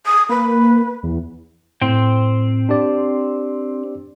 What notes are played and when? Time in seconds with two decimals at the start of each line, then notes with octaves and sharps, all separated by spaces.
0.06 D#6
0.29 A#3 B4
1.03 E2
1.81 A2 C4 C5 G5
2.69 D4 G4 D5